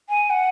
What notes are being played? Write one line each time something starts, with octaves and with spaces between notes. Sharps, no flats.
G#5
F#5